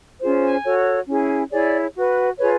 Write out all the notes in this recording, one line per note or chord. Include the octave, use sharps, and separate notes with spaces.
C#4 F4 G#4 C5
G#5
F#4 A4 C#5
C#4 E4 G#4
E4 G#4 C#5 D5
F#4 B4
F4 G#4 B4 C#5